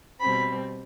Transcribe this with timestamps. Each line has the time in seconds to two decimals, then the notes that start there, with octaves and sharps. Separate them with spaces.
0.20 B2 G3 C4 B5